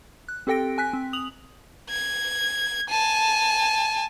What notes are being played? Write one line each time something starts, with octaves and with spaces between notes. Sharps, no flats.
F#6
C4 G4 A4 G5 A#6 D7
G#5 F#6 B6
C4
D#6 F7 F#7
G#6
G#5 A5